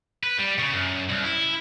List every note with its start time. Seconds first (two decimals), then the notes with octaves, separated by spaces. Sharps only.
0.23 B4
0.39 G3
0.59 C#3
0.73 F#2
1.09 C2
1.24 E4